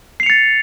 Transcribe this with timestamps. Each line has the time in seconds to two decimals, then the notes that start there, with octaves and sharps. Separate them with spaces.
0.20 C7
0.23 F7
0.26 C#7
0.30 A6